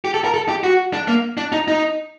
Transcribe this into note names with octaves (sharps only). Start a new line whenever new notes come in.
G4
A4
A#4
A4
G4
F#4
D4
A#3
D4
D#4
D#4